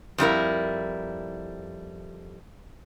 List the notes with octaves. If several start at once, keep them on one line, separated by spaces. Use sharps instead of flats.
F2 G3 E4 A#4